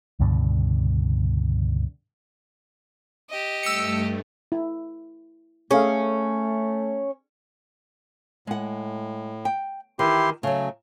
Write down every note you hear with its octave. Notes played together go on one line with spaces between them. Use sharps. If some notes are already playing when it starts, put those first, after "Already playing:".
C#2 G2 B2 D3
G4 D#5
G2 A3 E6 C#7
E4
A3 C#4 G#4 A4 F5
A2 G#3 F#5
G5
D#3 E3 E4 G4 C6
C#3 F#3 A3